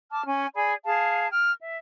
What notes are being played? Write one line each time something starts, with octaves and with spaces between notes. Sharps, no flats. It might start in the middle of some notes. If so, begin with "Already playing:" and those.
A5 D6 F6
C#4 G#5
G#4 D5 G#5 B5
G#4 F5 A5
G5 F6
E5